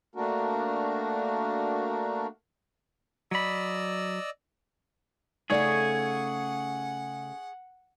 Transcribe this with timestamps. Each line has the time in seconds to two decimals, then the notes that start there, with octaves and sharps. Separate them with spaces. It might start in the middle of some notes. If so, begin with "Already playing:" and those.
0.15 A3 A#3 D4 F#4 A#4
3.31 F#3 D5 D#5 B5 E6
5.50 C#3 A3 D#4 G#4 A4 C#5 D5 F#5